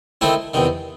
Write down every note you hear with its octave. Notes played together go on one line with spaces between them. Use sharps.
D#3 A3 C4 E4
E2 C3 D#3